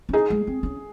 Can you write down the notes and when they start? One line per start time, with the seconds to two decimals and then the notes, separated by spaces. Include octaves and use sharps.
0.09 C#4
0.13 D#4 G#4
0.30 G#3
0.47 C4
0.63 C#4